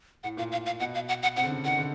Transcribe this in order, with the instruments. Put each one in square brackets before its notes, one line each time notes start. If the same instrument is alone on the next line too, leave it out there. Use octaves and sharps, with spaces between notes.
[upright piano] A2 [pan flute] F#5
[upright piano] A#2 [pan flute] F5
[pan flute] F5
F5
[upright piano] B2 [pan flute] F#5
[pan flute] F5
F#5
F#5
[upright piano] C3 [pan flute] F#5
[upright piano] D3
C#3
[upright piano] D#3 [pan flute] F#5
[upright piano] D3